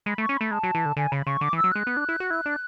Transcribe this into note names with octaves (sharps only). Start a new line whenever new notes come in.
G#3 B5
A3
C#6
C#4
A3 B5
G#3 A5
F#3
E3
D3
D3 G#5
C#3 B5
C#3 C#6
D3 D6
E3
E6
F#3
G#3 F#6
B3
D4
E4
F#4
E4
D4